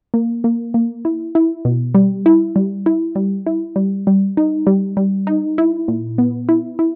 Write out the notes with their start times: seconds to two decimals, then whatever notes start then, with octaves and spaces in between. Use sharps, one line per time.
0.14 A#3
0.44 A#3
0.74 A#3
1.05 E4
1.35 E4
1.65 B2
1.95 G3
2.26 E4
2.56 G3
2.86 E4
3.16 G3
3.47 E4
3.76 G3
4.07 G3
4.37 D#4
4.67 G3
4.97 G3
5.27 D#4
5.58 E4
5.88 A#2
6.18 B3
6.49 E4
6.79 E4